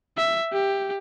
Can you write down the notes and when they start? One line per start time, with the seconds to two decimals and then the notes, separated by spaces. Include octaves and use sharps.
0.17 E5
0.53 G4